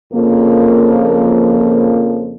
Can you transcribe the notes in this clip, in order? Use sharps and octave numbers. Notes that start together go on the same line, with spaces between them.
F2 C#3 F3 A#3